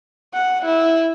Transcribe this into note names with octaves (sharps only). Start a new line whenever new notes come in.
F#5
E4